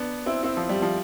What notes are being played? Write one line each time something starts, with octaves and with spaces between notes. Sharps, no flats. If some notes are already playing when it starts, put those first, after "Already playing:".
Already playing: B3 D4
C4 E4
C4 E4
F3
G3
F3